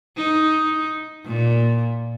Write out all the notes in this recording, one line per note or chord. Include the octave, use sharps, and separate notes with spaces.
D#4
A#2